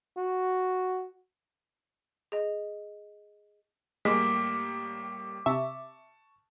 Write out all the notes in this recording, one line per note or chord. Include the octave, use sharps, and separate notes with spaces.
F#4
G#4 D#5
A2 G3 G#3 A#3 D6 B6
C3 E5 A5 C#6